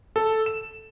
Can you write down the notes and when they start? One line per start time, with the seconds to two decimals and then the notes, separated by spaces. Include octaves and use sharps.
0.16 A4
0.46 E7